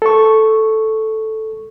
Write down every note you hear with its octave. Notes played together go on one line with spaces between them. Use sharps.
A4 C#6